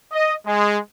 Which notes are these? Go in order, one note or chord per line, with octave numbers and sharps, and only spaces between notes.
D#5
G#3